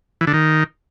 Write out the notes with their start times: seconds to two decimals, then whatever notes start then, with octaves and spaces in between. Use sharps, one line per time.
0.21 E3
0.27 D3
0.33 D#3